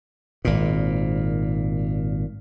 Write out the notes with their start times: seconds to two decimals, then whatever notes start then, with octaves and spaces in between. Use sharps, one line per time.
0.45 G#1 A#2